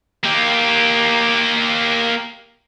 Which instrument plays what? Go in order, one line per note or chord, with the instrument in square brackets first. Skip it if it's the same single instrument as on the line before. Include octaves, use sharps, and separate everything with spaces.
[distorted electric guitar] A#3 G4